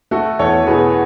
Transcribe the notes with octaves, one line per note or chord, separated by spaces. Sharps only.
A3 F#4 A4
E2 A4 C#5
B2 G#4 B4